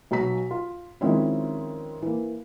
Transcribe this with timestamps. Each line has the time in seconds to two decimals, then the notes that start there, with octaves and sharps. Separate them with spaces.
0.11 B1 F#3 A#5 B6
0.51 F4
1.01 D#3 F3 G#3 C4 C#4 E4
2.02 E3 A#3